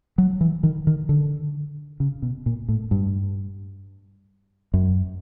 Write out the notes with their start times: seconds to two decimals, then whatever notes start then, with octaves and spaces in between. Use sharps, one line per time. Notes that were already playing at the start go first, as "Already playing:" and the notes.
0.18 F#3
0.41 E3
0.63 D#3
0.87 D#3
1.09 D3
2.00 C#3
2.22 B2
2.46 A#2
2.68 A2
2.91 G2
4.74 F#2